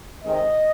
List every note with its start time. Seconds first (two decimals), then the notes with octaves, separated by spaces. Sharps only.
0.25 C3 D#3 G#3 C4 D#5